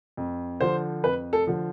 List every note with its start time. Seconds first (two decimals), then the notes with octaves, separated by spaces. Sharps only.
0.17 F2
0.61 D3 F3 C5
1.04 F2 B4
1.33 A4
1.47 D3 F3